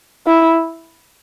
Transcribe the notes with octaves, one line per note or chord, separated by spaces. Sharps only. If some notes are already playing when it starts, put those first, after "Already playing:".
E4